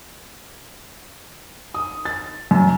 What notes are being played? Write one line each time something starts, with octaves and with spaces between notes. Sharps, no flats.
D#6
A6
F#2